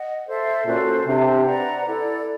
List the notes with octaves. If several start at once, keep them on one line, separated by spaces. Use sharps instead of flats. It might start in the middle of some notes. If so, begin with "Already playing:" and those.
Already playing: D#5 F#5
A4 C5 E5
A#2 C#4 F#4 A4 C5
C3 D4 G4 C5
B4 D5 F#5 A#5
E4 A4 D5